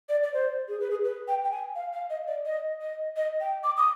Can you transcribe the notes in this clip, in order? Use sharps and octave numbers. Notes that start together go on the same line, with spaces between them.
D5
D5
C5
G#4
B4
G#4
B4
G5
G5
G#5
F5
F5
D#5
D5
D#5
D#5
D#5
G5
D6
D#6